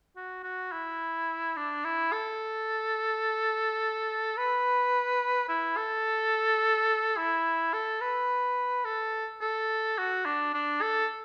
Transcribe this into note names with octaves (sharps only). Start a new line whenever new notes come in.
F#4
F#4
E4
D4
E4
A4
B4
E4
A4
E4
A4
B4
A4
A4
F#4
D4
D4
A4